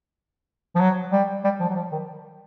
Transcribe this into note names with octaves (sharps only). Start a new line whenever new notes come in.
F3
F#3
G3
G3
F3
F#3
F3
D#3